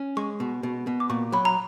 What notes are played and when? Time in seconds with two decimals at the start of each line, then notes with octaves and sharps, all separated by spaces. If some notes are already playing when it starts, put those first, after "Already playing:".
Already playing: C#4
0.17 G#3 C#6
0.40 B2
0.63 B2
0.87 B2
1.00 D6
1.10 A#2 C#6
1.32 F#3 B5
1.45 A#5